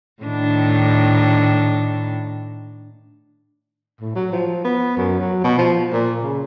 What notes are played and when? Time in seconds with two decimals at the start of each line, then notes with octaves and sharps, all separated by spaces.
0.23 A2 D#3 D4
4.00 A2
4.15 F#3
4.32 F3
4.65 B3
4.97 F#2
5.20 F#3
5.44 B2
5.58 F3
5.93 A#2
6.23 C#3